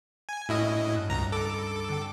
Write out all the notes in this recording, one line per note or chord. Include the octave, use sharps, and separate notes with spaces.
G#5
A2 C#4 D4 E4 F#4 D#5
G2 F#6
C#2 A#5
A4 B5 D6
D3 C4 G5